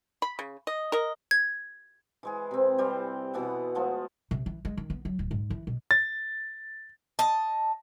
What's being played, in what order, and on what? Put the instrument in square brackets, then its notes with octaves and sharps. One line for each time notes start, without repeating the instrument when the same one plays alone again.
[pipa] B5
C#3
D#5
A#4 D#5
[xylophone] G#6
[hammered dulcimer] E3 G#3 G#4
C3 C4
E3 G3 C5
B2 E3 B3 F#5
F3 G#3 A3 F#4
[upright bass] C3
E3
G#3
D#3
B3
F#3
D1
G#2
E3
B2
[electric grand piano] A6
[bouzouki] D#5 A5